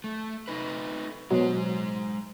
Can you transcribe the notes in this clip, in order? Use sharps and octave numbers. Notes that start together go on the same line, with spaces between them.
A3
A3 D#4 B4
B2 F#3 G#3 C5